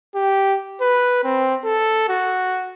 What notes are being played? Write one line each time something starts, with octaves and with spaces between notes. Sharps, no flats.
G4
B4
C4
A4
F#4